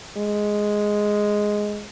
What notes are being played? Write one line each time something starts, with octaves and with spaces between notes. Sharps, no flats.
G#3